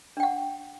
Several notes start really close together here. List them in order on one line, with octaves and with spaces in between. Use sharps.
D4 G5 F#5